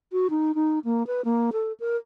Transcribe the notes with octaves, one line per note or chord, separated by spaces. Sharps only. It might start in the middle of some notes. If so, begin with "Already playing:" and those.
F#4
D#4
D#4
A#3
B4
A#3
A4
A#4